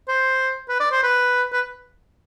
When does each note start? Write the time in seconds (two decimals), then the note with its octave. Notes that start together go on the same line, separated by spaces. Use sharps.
0.09 C5
0.69 B4
0.80 D5
0.92 C5
1.03 B4
1.53 B4